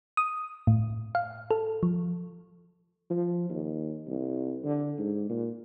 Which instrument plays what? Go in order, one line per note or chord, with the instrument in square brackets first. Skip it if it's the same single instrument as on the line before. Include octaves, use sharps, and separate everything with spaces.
[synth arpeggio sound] D#6
A2
F5
A4
F3
[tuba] F3
D#2
C2
D3
G#2
A#2